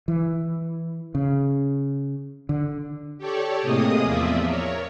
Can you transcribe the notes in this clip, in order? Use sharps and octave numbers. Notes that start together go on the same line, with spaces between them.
E3
C#3
D3
G4 A4 C#5 D5
A2 C3 A#3 G#4 D#5 D#6
E2 F3 F4 D5 E5
A#4 C#5